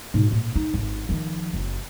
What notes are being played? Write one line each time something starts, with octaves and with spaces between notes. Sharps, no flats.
G#2 B2
A#2
D#4
G#1
D#3 F3
F#1